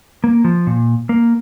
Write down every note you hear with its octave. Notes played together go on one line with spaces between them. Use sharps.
A#3
F3
A#2
A#3